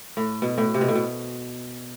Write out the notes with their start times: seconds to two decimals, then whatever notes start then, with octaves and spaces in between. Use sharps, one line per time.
0.17 A2
0.42 B2
0.58 A2
0.74 C3
0.81 B2
0.88 A2
0.95 B2